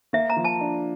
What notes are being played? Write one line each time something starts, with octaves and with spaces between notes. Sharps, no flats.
A#3 E5
A#5
F3
A5
D4